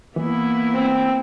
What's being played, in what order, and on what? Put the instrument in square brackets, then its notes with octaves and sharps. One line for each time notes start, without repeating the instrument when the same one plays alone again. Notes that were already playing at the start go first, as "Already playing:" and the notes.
[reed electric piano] E3 [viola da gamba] A#3 B3 E4
[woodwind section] C4